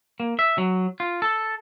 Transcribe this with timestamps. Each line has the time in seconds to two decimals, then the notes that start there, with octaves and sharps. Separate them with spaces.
0.20 A#3
0.39 E5
0.58 F#3
1.00 F4
1.22 A4